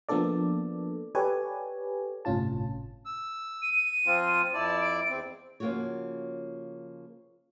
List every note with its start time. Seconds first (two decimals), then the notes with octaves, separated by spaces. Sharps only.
0.09 F3 A#3 B3 D4 A4 D5
1.15 G4 A4 B4 C#5 D5 G#5
2.25 G1 A2 C3 C#4 F4 A5
3.06 E6
3.62 D#7
4.06 F3 C4 F4
4.54 F2 E4 D5 A5
4.80 D7
5.09 E2 C4
5.60 C#3 F3 A#3 F4 F#4 C#5